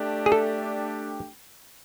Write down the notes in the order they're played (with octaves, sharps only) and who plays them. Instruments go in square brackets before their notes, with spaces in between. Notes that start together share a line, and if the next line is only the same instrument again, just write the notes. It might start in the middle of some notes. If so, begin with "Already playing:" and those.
Already playing: [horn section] A3 D4 G4
[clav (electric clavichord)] G#4
A4